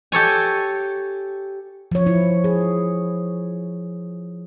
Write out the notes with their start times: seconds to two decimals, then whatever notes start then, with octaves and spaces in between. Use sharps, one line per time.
0.12 G4 A4 C#5 G#5
1.92 F3 C#5
2.06 E4
2.44 G#4